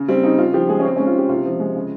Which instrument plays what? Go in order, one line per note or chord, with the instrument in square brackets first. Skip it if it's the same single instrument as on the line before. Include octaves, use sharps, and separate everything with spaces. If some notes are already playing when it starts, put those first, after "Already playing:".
Already playing: [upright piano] C#3
G3 C4
C#3 D#4
C#3 F4
F3 G4
G#3 G#4
C#4
C#3 C4
G#3 C#4
F4
C#3 G4
C3 F4
F3
G#3
C#3